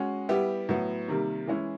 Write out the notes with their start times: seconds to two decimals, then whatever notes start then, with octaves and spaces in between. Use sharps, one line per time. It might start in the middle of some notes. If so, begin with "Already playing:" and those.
Already playing: G#3 C#4 F#4
0.29 G3 B3 E4 G4
0.69 A2 F#3 B3
1.08 C3 D#3 G3 A#3
1.47 E3 G#3 C#4 E4